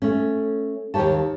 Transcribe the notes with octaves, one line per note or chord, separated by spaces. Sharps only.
A3 C#4
D#2 G#2 G4 C#5 A5